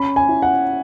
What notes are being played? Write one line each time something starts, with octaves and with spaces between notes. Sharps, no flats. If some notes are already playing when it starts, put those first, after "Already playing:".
Already playing: C#4 B5
G#5
E4
F#5